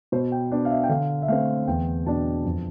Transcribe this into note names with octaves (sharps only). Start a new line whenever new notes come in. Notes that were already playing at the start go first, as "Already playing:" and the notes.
B2 C5
G5
B3 D4
F5
E5
G5
D3 F5
E5
A3 C4 F5
E2 G5
B2 B3 D4 A5
F2